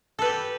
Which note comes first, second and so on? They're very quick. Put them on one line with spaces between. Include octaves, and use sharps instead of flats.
A4 B4 G4